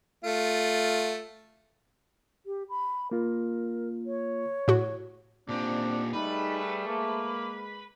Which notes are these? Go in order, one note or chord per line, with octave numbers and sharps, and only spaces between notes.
A3 F4
G4
B5
A#3 F4 A#4
C#5
A2 F#4
A#2 C4 D4 G4
G3 A3 D#4 G#4 B4
G#3 A#3